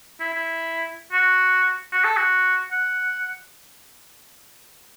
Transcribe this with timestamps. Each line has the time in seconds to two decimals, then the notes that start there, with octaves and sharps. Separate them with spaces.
0.20 E4
0.34 E4
1.13 F#4
1.92 F#4
2.04 A4
2.17 F#4
2.72 F#5